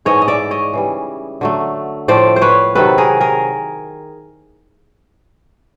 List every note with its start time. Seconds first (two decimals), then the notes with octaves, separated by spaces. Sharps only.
0.05 G#2 E3 A3 C#5 D#5
0.22 D#5
0.28 D5 E5
0.51 C#5 D#5
0.74 C#3 E3 G3
1.41 D3 F#3 A3
2.08 A2 F3 A3 C5 D5
2.36 C5
2.42 B4 C#5
2.75 C3 D#3 F#3 A4 B4
2.98 G#4 A#4
3.21 G#4 A#4